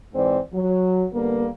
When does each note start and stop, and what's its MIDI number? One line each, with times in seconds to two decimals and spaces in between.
0.14 0.38 44
0.14 0.38 52
0.14 0.38 60
0.14 0.38 74
0.53 1.05 54
1.12 1.47 50
1.12 1.47 55
1.12 1.47 58
1.12 1.47 59